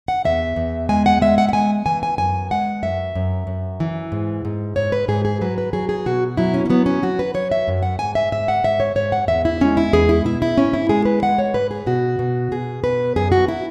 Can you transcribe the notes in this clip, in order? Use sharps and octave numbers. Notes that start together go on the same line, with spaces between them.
F#5
E2 E5
E2
G#3 G#5
F#5
G#3 E5
F#5
F#5
G#3 G#5
E3 G#5
G#5
F#2 G#5
G#3 F#5
F#2 E5
F#2
F#2
E3
G#2
G#2
G#2 C#5
B4
G#2 G#4
G#4
F#3 B4
B4
F#3 G#4
G#4
B2 F#4
F#3 E4
C#4
C#4
F#3 B3
C#4
F#3 F#4
B4
F#3 C#5
E5
F#2
F#5
G#2 G#5
E5
G#2 E5
F#5
G#2 E5
C#5
G#2 C#5
F#5
E2 E5
E4
G#3 C#4
E4
E2 G#4
E4
B2 E4
E4
G#2 C#4
E4
G#3 G#4
B4
G#3 F#5
C#5
G#2 B4
G#4
B2 F#4
B2
B2 G#4
B2 B4
F#2 G#4
F#4
E4